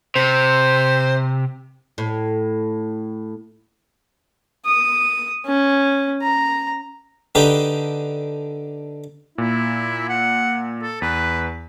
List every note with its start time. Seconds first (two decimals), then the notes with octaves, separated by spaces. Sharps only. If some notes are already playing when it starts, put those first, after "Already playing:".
0.16 C3 C5
1.98 A2
4.65 D#6
5.46 C#4
6.22 A#5
7.35 D3 D#4 G4 B4
9.38 A#2 E4
10.09 F#5
10.82 A4
11.02 E2 B4